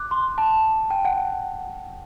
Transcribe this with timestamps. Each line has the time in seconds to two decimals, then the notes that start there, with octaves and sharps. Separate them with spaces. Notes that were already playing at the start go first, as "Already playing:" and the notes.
Already playing: D6 F#6
0.11 C6
0.38 A5
0.90 G5
1.05 F#5